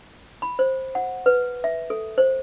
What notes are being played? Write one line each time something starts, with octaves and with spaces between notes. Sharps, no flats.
B5
C5
F#5
B4
E5
A4
C5